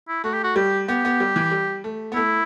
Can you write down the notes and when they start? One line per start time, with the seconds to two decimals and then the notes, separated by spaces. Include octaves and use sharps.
0.08 E4
0.24 A3 F#4
0.33 G4
0.44 F#4
0.56 G3 G4
0.88 B3 G4
1.05 B3
1.20 G3
1.36 E3
1.51 G3
1.84 A3
2.12 B3
2.15 A3 E4